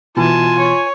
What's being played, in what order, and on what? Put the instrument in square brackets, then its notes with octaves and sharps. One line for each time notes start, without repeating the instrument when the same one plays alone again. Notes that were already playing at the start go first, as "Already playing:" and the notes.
[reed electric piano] B2 E3 [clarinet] F4 [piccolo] G#5 [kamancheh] A5
[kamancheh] C#5